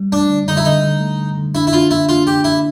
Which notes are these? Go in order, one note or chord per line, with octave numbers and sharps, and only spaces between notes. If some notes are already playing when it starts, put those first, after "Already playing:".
Already playing: G3
A3 D4
D3
D3 D#4
E4
D3 D#4
D3
A3
D3
D3
D4 E4
E4
D4 F4
A#3 E4
D4 F4
D4 G4
D4 E4